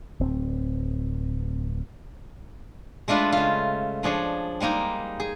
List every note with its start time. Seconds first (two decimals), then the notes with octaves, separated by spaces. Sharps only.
0.19 D1 C4
3.08 G#3 A3 D4 F4 B4
3.32 C#3 F4
4.03 F3 D4 G#4 C#5
4.60 G3 G#3 A#3 D#4
5.20 G#4